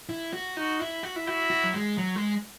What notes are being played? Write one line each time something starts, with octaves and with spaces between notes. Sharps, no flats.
E4
F#4
D#4 F#4
E4
F#4
E4
E4 F#4
F#4
F#3
G#3
F#3
G#3